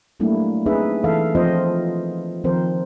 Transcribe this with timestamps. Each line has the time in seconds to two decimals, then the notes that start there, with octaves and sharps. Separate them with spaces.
0.20 F#3 G3 A3 A#3 D4 E4
0.66 C4 D4 D#4 G#4 B4 E5
1.04 E3 A4 E5 F5
1.35 F3 C4 F4 C5 D#5
2.44 D#3 F3 C4 A#4 C5